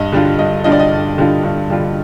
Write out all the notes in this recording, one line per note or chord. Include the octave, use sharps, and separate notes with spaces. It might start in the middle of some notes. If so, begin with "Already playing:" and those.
Already playing: G2 D#5
D3 G3 D4 F4
G2 D#5
D3 G3 D4 F4 D#5
D5
D#5
G2
D3 G3 D4 F4
G2
D3 G3 D4 F4